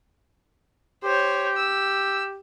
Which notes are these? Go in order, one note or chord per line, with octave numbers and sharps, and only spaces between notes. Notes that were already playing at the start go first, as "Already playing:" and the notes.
G4 C5 C#5
E6